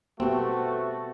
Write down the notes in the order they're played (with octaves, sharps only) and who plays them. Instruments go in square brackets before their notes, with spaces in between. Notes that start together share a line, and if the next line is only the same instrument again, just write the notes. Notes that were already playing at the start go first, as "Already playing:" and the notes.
[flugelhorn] A3 [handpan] B3 G4 [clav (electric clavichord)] C4 [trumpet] F#4